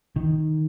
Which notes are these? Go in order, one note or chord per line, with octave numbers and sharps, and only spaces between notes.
D#3